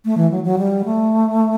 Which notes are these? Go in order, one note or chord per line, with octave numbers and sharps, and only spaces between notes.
A3
E3
F#3
F#3
G3
A3